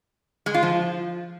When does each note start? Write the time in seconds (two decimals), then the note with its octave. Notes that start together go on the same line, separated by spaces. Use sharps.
0.46 G#3
0.54 F4
0.63 F3